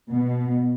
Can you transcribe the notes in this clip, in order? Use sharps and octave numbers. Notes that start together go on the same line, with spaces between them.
B2